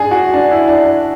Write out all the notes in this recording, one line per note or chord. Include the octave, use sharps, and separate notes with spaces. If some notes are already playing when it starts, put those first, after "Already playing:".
Already playing: G#2 D4 G#4
F#4
D4
E4
D4
D4